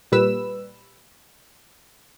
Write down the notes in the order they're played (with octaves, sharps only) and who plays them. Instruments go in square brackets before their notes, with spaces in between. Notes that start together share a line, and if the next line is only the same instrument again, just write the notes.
[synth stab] A#2 G3 B4 E6